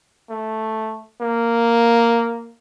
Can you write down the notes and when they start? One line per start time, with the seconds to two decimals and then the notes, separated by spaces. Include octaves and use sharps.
0.30 A3
1.21 A#3